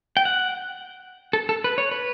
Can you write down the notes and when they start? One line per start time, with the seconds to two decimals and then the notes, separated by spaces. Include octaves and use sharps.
0.17 G5
0.25 F#5
1.33 A4
1.49 A4
1.64 B4
1.78 C#5
1.91 B4